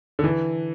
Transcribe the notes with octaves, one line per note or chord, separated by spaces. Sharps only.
D3
E3